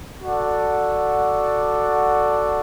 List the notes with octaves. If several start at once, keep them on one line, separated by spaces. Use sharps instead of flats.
F#4 A4 D5 F#5